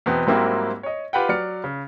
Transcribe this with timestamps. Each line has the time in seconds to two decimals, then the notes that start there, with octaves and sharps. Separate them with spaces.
0.06 E2 B2 B3 C4
0.26 G#2 F#3 G3 A#3 C4 E4
0.83 C#5 D#5
1.13 F4 G4 B4 F#5 G5
1.29 F#3 D5 F6 C#7
1.64 C#3